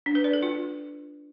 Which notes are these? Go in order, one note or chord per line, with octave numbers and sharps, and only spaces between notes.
D4
B4
D5
A4
F4